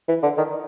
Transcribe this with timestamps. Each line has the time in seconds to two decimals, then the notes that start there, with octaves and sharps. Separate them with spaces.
0.08 E3
0.23 D3
0.38 D#3